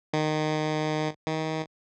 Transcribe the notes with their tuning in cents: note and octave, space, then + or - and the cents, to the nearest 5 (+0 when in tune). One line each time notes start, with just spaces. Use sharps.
D#3 -15
D#3 +25